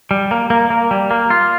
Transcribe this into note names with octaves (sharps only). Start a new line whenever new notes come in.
G3
A#3
A#3
A#3
G3
A#3
F4